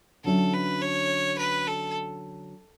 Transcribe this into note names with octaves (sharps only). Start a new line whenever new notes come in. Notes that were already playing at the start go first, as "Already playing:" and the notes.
D3 F#3 C#4 E4 A4
B4
C#5
B4
A4